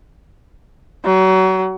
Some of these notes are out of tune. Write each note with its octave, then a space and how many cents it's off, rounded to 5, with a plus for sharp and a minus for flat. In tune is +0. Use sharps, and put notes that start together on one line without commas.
F#3 +30